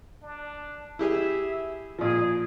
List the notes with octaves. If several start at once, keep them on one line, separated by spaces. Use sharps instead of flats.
D4
E4 G4 G#4 E5
A#2 F3 G#4